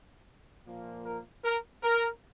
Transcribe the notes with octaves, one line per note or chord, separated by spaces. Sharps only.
A#2 F3 A#3
A#4
A#4
A#4